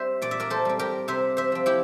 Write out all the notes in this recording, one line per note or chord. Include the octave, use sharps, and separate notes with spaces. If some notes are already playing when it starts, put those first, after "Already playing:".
Already playing: G3 C4 C5 E5
A#2 D5
E5
A#4 D5
A4 C5
G3 C4
G4 A#4
C3 C5 E5
C5 E5
F3 C4
E4 G4